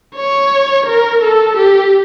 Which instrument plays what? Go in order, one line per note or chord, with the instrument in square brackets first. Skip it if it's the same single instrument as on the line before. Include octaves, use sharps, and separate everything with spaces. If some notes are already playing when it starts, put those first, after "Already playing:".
[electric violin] C#5
A#4
A4
G4